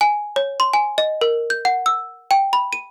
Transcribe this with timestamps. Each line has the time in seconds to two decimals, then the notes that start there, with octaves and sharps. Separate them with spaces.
0.01 G#5
0.36 C#5
0.60 C6
0.74 G#5
0.98 D#5
1.21 A#4
1.50 G6
1.65 F#5
1.86 E6
2.31 G5
2.53 B5
2.73 D#7